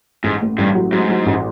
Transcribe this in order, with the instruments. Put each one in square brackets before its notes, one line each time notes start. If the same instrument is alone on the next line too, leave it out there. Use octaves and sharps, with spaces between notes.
[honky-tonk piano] A1 [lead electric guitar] G#2
[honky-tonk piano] A2
[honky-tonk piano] A1 [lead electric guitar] G2
[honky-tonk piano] F#3
[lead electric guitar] G#2 [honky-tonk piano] F#3
[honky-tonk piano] F#3
A1